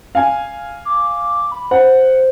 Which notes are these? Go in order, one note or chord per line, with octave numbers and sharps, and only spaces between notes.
F5 G#5
D6
B5
C5 F#5